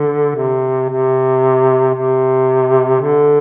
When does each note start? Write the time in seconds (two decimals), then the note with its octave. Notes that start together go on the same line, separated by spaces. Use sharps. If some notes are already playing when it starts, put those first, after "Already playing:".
Already playing: D3
0.36 C3
0.89 C3
1.95 C3
3.01 D3